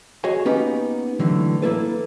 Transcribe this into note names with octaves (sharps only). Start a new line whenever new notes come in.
F#4 G#4 C#5 D#5 G#5
A#3 B3 C#4 D#4 G4 B4
A2 D3 E3 F#3
A#3 E4 A4 B4